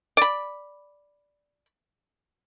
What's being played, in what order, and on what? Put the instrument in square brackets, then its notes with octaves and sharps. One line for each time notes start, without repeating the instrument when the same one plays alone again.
[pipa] D5 B5